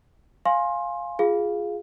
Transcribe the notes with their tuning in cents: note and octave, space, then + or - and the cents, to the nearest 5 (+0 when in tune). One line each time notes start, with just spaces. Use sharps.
F5 +0 G#5 +0 C6 +25
F4 +0 G#4 +0 F5 +0